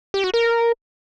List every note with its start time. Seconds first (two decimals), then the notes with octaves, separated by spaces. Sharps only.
0.14 G4
0.24 F#4
0.34 A#4